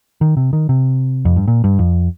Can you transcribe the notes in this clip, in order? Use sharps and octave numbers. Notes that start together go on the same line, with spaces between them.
D#3
C3
D#3
C3
F2
G2
A#2
G2
F2